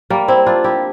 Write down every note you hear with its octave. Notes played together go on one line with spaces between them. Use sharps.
G3 A#3
C4 E4
D4 F4
E4 G4